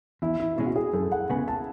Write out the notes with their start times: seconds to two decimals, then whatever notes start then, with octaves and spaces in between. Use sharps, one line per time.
0.22 E2 E4
0.40 E4
0.56 B2 G#3 C#4 E4
0.66 F#4
0.76 G#4
0.93 F#2 A4
1.12 F#5
1.30 C#3 G#3 B3 G#5
1.48 A5